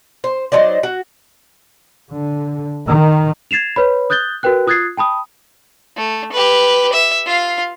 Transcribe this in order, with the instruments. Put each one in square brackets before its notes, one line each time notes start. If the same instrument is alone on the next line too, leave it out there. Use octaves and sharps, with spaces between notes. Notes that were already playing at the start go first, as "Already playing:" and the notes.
[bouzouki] C5
F#3 D#4 C5 D5
F#4
[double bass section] D3
D#3
[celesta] G#6 A6 C7 E7 F7
B4 C#5 B5
D#6 F#6 G6 A6 G7
F#4 A#4 B4 G5 F#6
F4 D#6 F#6 G#6 A6 C7
G5 A5 B5 D#6
[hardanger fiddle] A3
G4 B4
E5
F4 F5